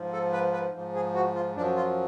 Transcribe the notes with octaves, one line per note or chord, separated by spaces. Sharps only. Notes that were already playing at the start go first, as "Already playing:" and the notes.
Already playing: G#2 F3
A4
B4
B4
G#2 F3
G#4
F#4
F4
F#2 F3 D4
F4